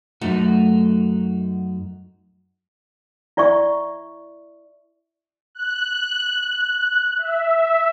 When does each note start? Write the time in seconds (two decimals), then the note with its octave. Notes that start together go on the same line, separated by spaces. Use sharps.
0.21 F#2 A3 D#4 F#4
3.37 E4 D5 E5 C#6
5.55 F#6
7.19 E5